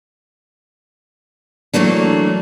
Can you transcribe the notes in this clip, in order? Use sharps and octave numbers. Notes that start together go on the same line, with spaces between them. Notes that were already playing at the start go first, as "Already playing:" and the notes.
E3 F#3 A3 A#3 D4